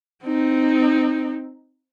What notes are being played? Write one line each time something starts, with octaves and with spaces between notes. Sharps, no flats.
C4 D#4